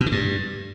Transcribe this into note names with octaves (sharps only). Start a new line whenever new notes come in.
B2
D#3
G2